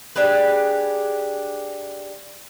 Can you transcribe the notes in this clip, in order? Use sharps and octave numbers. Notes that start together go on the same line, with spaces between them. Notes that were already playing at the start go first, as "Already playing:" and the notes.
D4 G4 G#4 B4